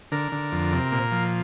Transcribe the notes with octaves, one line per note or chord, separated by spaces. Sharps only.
D3 A#4
D3
F2
C3
A#2
F3